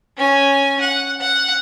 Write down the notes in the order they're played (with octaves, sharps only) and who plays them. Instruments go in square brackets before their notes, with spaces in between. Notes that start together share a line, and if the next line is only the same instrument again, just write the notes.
[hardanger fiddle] C#4 G#5
F#5
F#5